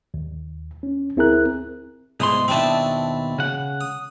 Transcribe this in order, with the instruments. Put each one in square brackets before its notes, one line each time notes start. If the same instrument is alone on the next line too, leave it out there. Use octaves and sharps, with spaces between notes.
[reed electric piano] D#2
C#4
D2 C4 E4 G#4 A#4 F#6
[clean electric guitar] C2 B3 C6 [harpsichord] G#2 D#6
[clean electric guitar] D#2 B2 A5 [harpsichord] C4 D4 E4
[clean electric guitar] C#3 F#5
[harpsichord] D#6